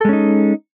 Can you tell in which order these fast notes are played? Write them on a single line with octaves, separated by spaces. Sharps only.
A4 G#3 C#4 D#4